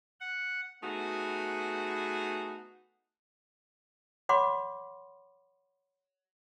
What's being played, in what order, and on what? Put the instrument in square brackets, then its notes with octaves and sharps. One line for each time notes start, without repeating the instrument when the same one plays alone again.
[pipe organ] F#5
[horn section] A3 B3 D#4 F#4 G#4
[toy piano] C#5 F#5 B5 C6 D6